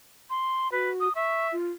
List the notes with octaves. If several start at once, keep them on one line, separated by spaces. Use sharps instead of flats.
C6
F#4 B4
D#6
E5 C#6
F4